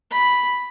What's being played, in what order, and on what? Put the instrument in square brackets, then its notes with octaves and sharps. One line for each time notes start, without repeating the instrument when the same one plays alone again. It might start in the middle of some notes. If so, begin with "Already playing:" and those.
[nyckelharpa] B5